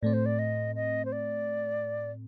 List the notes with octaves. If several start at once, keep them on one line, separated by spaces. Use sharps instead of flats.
A2 A3 C4 D5
C5
D5
D#5
D#5
C5
D5